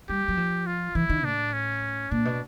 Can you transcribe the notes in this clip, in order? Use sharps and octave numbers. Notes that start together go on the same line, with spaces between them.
G3 G4
F#3
F3
F4
E3 E4
D#3
A2 D4
C#4
A#2 D4
B2